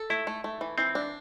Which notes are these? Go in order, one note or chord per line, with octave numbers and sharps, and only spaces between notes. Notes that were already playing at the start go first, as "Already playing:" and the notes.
Already playing: A4
A3 E4
A3
A3
E3
E3 C4
D4